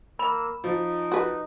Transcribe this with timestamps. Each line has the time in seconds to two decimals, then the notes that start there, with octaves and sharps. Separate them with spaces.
0.19 A#3 B5 E6
0.64 F3 D#4
1.12 F#4 B4